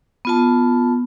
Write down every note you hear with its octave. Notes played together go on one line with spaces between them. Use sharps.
B3 F4 A5